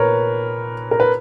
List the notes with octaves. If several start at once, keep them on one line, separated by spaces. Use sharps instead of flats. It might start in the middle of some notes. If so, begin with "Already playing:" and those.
Already playing: A#2 A#4 B4 C#5
A#4
B4